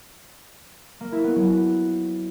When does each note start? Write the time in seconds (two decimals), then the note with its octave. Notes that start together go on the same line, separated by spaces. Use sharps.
1.01 A#3
1.12 E4
1.24 B3
1.36 F#3
1.47 F#4